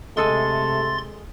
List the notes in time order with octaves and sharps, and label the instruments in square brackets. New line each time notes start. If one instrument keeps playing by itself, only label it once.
[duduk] C3 [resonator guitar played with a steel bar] G#3 A4 G#5 [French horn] A3 [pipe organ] C6 A6